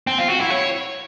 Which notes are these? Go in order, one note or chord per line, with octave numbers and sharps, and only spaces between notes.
C4
F4
F#4
E4
C#5